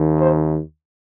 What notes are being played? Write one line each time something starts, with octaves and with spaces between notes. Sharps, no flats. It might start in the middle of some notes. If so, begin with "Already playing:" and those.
Already playing: D#2 D#3
C5